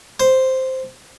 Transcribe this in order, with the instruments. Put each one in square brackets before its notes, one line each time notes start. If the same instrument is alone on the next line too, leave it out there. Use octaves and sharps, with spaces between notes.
[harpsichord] C5